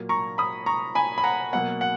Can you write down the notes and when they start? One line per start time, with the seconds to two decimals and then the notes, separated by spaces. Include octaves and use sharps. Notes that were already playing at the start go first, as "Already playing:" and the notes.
Already playing: A#2 F#3 A#3
0.09 A#5 C#6
0.38 B5 D#6
0.66 A#5 C#6
0.95 G#5 B5
1.18 B5
1.24 F#5 A#5
1.53 B2 F#3 A#3 F#5
1.81 F#5